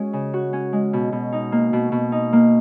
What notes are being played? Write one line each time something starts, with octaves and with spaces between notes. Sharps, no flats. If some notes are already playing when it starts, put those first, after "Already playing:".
Already playing: G#3 C#4 F#4
C#3
F#4
C#4
G#3
B2
B2
D#4
A#3
B2
B2
D#4
A#3